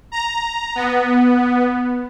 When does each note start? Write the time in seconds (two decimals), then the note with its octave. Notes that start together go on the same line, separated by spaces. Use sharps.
0.12 A#5
0.75 B3